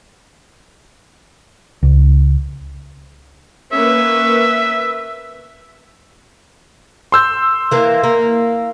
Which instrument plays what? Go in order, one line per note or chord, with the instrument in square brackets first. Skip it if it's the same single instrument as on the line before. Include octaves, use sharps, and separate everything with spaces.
[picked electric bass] C#2
[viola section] A#3 C#4 B4 [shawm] E5
[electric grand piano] C6 E6 G6
[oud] E3 A#3
A#3